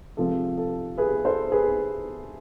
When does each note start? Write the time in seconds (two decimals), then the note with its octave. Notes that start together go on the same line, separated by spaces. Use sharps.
0.17 C3 F3 G#3 C4 A4
0.58 A4
0.98 G#4 B4
1.25 A4 C5
1.52 G#4 B4